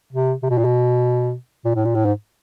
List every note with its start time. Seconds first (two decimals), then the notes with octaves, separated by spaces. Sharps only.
0.12 C3
0.42 C3
0.50 B2
0.58 A#2
0.64 B2
1.65 A#2
1.75 A2
1.85 A#2
1.95 A2
2.05 G#2